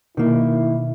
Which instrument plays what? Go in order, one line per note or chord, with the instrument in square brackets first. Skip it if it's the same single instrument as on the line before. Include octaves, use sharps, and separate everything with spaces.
[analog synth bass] B2 [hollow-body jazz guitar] D#3 A#3 [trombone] E4